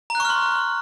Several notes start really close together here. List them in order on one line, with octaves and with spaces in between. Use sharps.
A#5 F#6 C#6 F6 C6